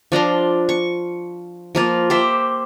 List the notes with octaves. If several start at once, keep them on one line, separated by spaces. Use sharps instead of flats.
F3 D4 A#5 C6
C#6
F3 A#3 F4
G4 C5 E5